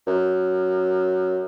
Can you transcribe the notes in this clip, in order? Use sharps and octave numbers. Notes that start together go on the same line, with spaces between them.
F#2